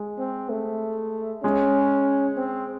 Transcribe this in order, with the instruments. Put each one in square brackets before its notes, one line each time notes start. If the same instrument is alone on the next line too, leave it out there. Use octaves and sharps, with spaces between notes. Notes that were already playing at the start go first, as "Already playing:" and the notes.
Already playing: [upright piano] G#3
[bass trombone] C4
A3
[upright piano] G#3 [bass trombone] C#4
[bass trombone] C4